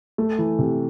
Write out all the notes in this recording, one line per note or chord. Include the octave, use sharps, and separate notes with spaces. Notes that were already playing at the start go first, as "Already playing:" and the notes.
A3
E3
C3